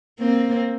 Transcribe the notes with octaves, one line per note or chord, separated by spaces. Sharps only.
A#3 C4